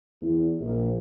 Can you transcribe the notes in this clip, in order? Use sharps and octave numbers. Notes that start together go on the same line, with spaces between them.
E2
A#1